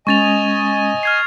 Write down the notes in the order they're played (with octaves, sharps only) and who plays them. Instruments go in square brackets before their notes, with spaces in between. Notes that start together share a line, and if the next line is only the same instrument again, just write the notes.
[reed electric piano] G#3 C#4 [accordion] D#5 G#5 [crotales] C#6 A6 F7
[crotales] F6 G#6 C7